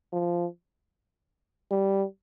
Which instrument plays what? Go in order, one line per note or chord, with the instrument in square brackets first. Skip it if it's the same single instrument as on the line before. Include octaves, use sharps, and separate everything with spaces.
[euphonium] F3
G3